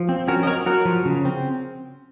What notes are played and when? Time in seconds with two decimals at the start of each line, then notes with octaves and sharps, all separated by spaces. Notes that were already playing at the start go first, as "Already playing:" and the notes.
Already playing: F3
0.09 C4
0.28 C#4 F#4 A#4
0.43 D#5
0.47 F#3 A#4 C#5
0.66 F#3 F#4 A#4
0.85 F3
1.05 C#3
1.25 C4